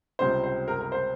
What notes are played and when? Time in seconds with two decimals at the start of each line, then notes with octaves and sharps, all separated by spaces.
0.19 C#2 C3 G3 C5
0.44 C5
0.68 A#4
0.80 A#4
0.92 C5